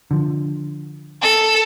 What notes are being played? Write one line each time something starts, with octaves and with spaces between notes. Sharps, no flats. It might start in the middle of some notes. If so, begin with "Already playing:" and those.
D3 F3
A4